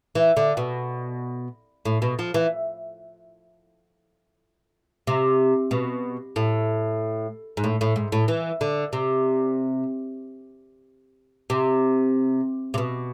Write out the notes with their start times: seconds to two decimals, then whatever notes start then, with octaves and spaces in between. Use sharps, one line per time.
0.15 E3
0.37 D3
0.57 B2
1.85 A2
2.02 B2
2.19 F3
2.34 E3
5.07 C3
5.71 B2
6.36 A2
7.57 G#2
7.64 A2
7.81 A2
7.96 G#2
8.12 A2
8.28 E3
8.61 D3
8.93 C3
11.50 C3
12.74 C3
12.78 B2